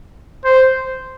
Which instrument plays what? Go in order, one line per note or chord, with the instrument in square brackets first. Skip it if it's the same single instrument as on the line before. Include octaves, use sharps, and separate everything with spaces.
[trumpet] C5